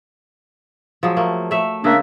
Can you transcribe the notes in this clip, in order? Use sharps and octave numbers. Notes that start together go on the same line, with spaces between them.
F3 F#3 G#3
A3 A#3
A3 E5
C#3 G#3 A#3 D4 E5